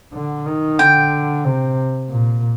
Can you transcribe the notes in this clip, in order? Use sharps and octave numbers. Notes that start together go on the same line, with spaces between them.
D3
D#3
D3 G5
C3
A#2